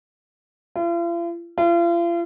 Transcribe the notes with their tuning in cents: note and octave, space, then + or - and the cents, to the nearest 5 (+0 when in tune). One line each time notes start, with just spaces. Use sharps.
F4 -45
F4 -40